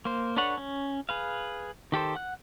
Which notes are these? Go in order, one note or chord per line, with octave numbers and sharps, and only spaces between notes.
A#3 C5
D4 A4 B4 C#5 F#5
C#4
G#4 B4 F5
D#3 G4 A4 C5
F#5 F#6